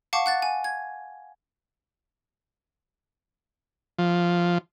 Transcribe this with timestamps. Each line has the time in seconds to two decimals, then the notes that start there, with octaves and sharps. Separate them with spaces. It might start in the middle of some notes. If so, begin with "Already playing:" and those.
0.13 F5 F#5 A5 C#6 D6
0.26 F#5 F#6 A6
0.42 G#5
0.64 G#6
3.98 F3